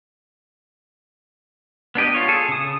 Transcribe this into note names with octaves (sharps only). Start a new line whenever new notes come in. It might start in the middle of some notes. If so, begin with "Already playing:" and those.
B3 D4 G4 D#5
F4 C#5
G#4 A4
C#3 D#6